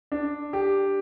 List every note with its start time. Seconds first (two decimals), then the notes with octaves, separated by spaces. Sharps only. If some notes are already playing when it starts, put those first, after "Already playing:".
0.12 D4
0.53 G4